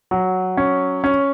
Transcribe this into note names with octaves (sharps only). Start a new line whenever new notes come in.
F#3
C#4
C#4